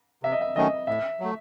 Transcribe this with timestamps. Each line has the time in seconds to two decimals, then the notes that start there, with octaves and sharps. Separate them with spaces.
0.23 C3 E5
0.32 D#5
0.41 E5
0.56 D#3 F#3 A3 C#4 D#5
0.87 A2 E5
1.20 F#3 A3